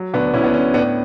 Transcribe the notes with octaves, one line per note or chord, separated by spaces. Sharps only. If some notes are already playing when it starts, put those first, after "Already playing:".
Already playing: F#3
D2 B3 D4
D2 C#4 E4
B3 D4
D3 C#4
A2 B3 D4